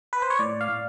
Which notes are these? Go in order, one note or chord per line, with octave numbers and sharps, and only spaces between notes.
B4
C5
C#5
A2 D5
F5
A2